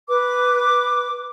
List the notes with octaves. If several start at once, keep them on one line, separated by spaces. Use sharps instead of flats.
B4 D6